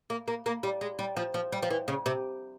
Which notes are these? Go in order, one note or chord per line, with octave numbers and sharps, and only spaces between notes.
A#3
A#3
A#3
G3
G#3
G3
F3
F3
G3
F3
E3
C#3
C3